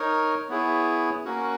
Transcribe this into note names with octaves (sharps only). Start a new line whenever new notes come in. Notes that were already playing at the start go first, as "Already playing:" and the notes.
Already playing: D#4 A#4 C#5
B3 E4 G#4 C#5
A#3 C#4 F#4